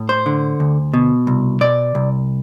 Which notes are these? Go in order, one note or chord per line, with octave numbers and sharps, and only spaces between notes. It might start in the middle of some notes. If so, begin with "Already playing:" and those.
Already playing: A2
C5
D3
D2
B2
C2
B2 D5
C2